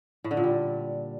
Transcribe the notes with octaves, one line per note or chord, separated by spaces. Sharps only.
A2
D3
A#2
G3